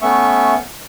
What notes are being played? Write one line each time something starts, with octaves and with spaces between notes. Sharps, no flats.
A3 B3 C#4 E5 C#6